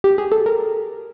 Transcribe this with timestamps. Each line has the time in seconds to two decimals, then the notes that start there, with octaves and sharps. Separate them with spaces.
0.04 G4
0.18 G#4
0.32 A4
0.46 A#4